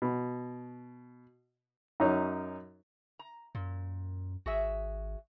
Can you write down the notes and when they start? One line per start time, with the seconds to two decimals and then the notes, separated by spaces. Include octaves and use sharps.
0.02 B2
2.00 F#2 C#4 D#4
3.19 A#5
3.55 F#2 A#2
4.46 G#1 F#4 G#4 E5